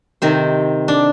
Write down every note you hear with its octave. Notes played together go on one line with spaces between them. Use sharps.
C3 D#3 C5
D4